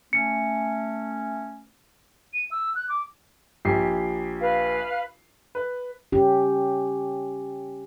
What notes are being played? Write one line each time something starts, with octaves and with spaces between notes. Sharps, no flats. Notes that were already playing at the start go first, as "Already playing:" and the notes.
A3 C#4 C#7
D#7
E6
F#6
D6
A#1 G4 C7
B4 F5
B4
C#4 G4